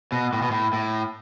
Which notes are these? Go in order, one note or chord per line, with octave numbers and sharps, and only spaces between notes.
B2
A2
B2
A2
A2